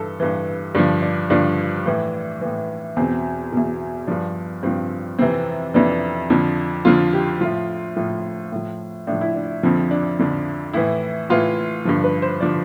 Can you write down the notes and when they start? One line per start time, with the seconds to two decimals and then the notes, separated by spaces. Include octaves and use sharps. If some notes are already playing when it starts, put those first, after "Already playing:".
Already playing: G2 E3 A4
0.20 G2 E3
0.75 G2 D3 F3 D4
1.02 D4
1.30 G2 D3 F3 D4
1.86 A2 E3
2.41 A2 E3
2.97 E2 B2 C4
3.52 E2 B2
4.07 G2 F3 D4
4.63 G2 F3 C4
5.19 F2 C3 E3 C4
5.74 F2 C3 E3 D4
6.30 F2 D3 F3
6.85 F2 D3 F3 F4
7.13 G4
7.41 A2 F3 F4
7.97 A2 F3
8.52 A2 F3
9.07 A2 D4
9.12 F3
9.21 E4
9.36 D4
9.63 F2 D3 F3 C4
9.91 D4
10.19 F2 D3 F3
10.74 A2 E3 E4
11.30 A2 E3 F4
11.85 G2 D3 F3
12.04 B4
12.22 C5
12.41 D3 F3 D5